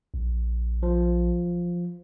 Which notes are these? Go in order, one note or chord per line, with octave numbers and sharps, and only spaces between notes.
A#1
F3